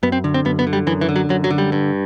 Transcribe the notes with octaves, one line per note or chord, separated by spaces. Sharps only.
F#2 B3
C4
D3
C4
F#2 B3
B3
D3
G3
F#2 E3
E3
D3
F#3
F#2 F#3
F#3
D3
G3
G2